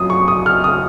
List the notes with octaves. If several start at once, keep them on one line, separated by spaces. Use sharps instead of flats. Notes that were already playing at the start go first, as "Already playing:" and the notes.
Already playing: F#2 F3 D#6
C#6
D#6
F6
D#6